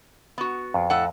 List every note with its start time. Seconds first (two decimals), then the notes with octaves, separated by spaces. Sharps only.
0.38 B3 F#4
0.74 F2
0.90 A2 A4 F#5